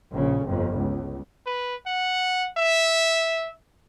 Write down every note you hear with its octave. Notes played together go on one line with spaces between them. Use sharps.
A#1 C#3
G1 F2
C#2
B4
F#5
E5